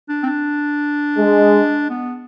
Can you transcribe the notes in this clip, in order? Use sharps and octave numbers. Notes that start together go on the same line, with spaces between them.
D4
C4
D4
G#3
B3